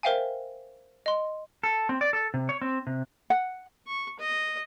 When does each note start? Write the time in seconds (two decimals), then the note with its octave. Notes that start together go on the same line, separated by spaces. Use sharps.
0.03 A#4 C5 E5 F5 G5 G#5
1.06 D#5 C6
1.63 A4
1.89 C4
2.01 D5
2.13 A4
2.34 C3
2.49 C#5
2.61 C4
2.87 C3
3.30 F#5
3.87 C#6
4.20 D#5